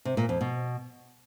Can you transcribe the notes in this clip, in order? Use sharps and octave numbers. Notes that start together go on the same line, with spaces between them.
C3
A#2
F2
B2